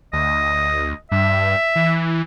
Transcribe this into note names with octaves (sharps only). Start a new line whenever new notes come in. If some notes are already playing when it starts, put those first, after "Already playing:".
D2 D#5
G2 E5
E3